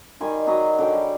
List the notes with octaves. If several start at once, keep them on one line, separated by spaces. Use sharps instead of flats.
D#3 G3 G#5 C6
F#3 G#4 D#5 B5
D3 F#3 G5
G3